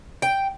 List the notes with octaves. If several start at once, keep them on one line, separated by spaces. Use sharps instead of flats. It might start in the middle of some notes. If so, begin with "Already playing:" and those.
G5